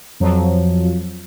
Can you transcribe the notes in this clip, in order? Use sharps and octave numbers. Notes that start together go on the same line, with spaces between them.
F2 F3 F#3